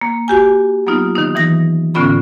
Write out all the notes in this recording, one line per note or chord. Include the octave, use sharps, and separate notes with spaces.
A#3
F#4 G4 G#5
F#3 A#3 B3 D#4 F4
D#3 D#4
E3 D#4 A#6
A2 D3 B3 C#4 F4 B5